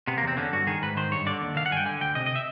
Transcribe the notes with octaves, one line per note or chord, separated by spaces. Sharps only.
C3 B3
A#3
E2 C4
D3 C#4
G2 F#4
D#3 G#4
G#2 B4
D#3 C5
G2 C#5
D3 D5
D#2
D#3 F5
F#5
G2 G#5
G5
D3 G#5
D2 G5
C3 D#5
D#5
E5